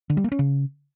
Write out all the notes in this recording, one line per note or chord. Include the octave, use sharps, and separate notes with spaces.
D3
G3
A#3
C#4
C#3